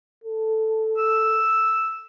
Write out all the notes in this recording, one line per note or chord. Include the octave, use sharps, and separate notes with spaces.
A4
E6